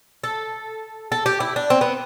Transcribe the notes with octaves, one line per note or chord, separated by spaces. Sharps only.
A4
A4
G4
E4
D4
C4
B3